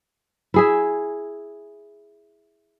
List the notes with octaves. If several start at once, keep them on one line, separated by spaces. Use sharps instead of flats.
E4 G#4 E5